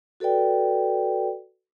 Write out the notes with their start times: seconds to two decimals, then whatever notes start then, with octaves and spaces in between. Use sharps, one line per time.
0.20 F#4 A4 B4 D5 G5